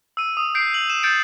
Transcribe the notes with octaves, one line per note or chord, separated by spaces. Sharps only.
E6 D#7
D#6
G6 C7 D7
F#7
E7
G6 A6 C#7 D7